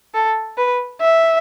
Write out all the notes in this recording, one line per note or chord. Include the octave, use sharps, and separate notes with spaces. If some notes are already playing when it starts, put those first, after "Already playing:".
A4
B4
E5